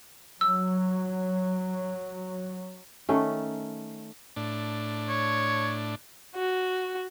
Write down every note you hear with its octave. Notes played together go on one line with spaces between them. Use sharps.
F#3 E6
D#3 A3 C#4
A2 D4
C#5
F#4